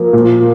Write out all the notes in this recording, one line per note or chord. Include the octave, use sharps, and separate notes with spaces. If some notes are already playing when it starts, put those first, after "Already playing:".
Already playing: F3 A#3
A#2